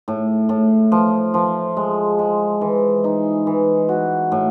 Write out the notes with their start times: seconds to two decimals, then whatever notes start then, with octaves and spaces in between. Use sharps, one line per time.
0.08 A2
0.49 A2
0.92 F3
1.34 F3
1.77 G#3
2.19 G#3
2.61 E3
3.04 D#4
3.47 E3
3.89 F#4
4.32 A2